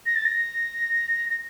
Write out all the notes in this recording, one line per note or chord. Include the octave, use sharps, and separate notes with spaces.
A#6
A6
A#6
A#6